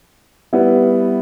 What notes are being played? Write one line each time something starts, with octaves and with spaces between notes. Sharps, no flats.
G3 B3 E4